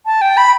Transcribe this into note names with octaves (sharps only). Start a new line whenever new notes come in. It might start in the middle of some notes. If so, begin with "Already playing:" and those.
A5
G5
B5